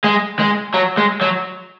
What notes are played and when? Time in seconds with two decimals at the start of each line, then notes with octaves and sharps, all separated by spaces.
0.04 G#3
0.39 G#3
0.74 F#3
0.97 G#3
1.21 F#3